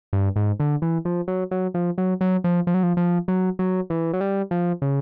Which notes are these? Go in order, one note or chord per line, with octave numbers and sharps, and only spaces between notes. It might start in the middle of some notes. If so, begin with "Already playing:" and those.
G2
G#2
D3
E3
F3
F#3
F#3
F3
F#3
F#3
F3
F3
F#3
F3
F3
F#3
F#3
E3
F#3
G3
F3
C#3